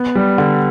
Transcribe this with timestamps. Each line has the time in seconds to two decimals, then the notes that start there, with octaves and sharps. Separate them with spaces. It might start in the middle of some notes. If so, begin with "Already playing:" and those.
Already playing: B3
0.15 G3
0.38 D3